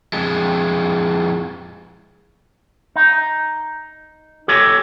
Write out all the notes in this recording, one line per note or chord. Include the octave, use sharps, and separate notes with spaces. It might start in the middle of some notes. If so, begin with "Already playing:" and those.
F2 G#3
D#4
G4 A4 C#5 D#5 G#5